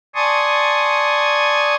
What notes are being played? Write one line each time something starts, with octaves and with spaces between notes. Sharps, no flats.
D5 G#5 A5 C6 C#6 D#6